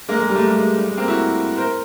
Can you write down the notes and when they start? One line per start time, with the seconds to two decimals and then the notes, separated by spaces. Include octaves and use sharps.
0.09 G#3 A#3
0.19 G#3
0.29 G3
0.35 A3
0.39 G#3
0.48 G3 A3
0.59 G#3
0.78 G3
0.88 G#3
0.98 A#3 C4
1.08 E4 F#4
1.58 A#4 C5